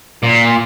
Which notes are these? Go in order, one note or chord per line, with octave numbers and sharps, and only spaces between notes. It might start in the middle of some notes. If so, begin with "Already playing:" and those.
A#2